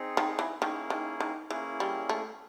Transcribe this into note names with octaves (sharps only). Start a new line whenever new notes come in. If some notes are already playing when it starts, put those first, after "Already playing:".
Already playing: C4 D#4 G#4
D#3
E3
D#3 A#3 C#4 E4 G#4
D#3
D#3
E3 A#3 C#4 E4 G#4
G3
A3